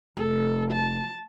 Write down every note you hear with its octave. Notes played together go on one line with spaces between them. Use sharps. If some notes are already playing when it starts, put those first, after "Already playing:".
F1 A4
A5